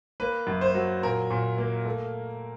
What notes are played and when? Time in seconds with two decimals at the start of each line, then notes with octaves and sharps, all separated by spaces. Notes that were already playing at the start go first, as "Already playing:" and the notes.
0.20 A#3 B4
0.47 F#2
0.61 C5
0.75 F#3
1.03 A#2 A#4
1.31 A#2
1.58 A#3
1.85 A3